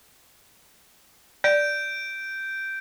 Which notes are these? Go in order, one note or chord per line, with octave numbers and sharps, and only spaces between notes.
D5 G6 D7